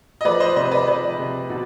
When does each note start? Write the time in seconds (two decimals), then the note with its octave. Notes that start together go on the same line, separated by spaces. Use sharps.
0.21 D#5
0.25 F3 B4 D5
0.40 C5 D#5
0.56 C3 C5 D#5
0.71 B4 D5
0.87 F3 B4 D5
1.19 C3
1.50 B2